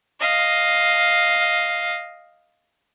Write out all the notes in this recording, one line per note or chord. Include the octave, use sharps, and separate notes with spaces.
D#5 F5